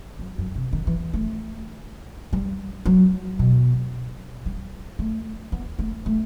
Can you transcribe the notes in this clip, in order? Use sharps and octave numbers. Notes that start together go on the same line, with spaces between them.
F#2
F#2
C3
D#3
E3
A3
G3
F#3
B2
G3
A3
B3
A3
A3